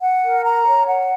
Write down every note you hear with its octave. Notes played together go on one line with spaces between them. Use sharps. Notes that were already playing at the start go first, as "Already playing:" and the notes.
F#5
A#4
A#5
C#5
F#5